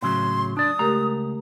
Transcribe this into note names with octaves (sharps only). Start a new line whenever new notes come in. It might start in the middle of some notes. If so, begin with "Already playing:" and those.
A2 C#3 F#3 C6
D4 D5 D#6
C#2 A3 G4 A#4 A#5